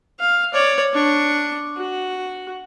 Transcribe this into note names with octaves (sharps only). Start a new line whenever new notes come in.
F5
C#5 D5
D4 C#6
F#4